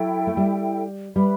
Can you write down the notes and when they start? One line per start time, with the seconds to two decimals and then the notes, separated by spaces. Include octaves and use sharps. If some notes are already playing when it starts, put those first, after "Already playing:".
Already playing: F#3 E4 A4 E5 G5
0.27 A3
0.37 G3
1.15 G3 B4 E5 B5